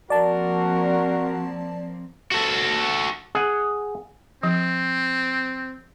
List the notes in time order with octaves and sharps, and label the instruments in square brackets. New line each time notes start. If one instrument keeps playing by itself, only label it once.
[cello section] F3 A#3 C4 [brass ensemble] F#4 A#4 [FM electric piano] D5 A5
[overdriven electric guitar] F#4 A4
[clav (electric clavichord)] G#4 F#5
[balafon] F3 [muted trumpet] C4